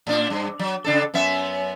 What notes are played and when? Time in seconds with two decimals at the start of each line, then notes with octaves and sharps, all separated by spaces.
0.07 A2 D4
0.30 G2
0.59 F#3
0.84 C#3 D4 A4
1.14 F#2 B3 E5